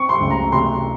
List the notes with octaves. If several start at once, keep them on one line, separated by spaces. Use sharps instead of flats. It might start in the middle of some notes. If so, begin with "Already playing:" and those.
Already playing: C4 C#6
C6
C#2
A#5
C3 C6